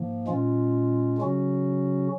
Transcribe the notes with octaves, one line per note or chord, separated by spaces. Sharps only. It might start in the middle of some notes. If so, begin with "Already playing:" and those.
Already playing: G#2 F3 A#3
A#2 G#3 C#4 F4
C#3 F#3 C#4 F#4